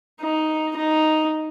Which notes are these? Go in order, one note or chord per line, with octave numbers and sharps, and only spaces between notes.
D#4
D#4